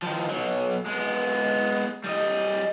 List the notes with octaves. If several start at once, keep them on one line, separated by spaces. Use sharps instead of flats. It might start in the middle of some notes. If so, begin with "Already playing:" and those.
D#3 F3
B2 F#3
G#3 B3
G3 D#5